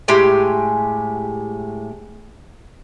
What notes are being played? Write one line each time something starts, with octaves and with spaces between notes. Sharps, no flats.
A2 G#3 G4 G#5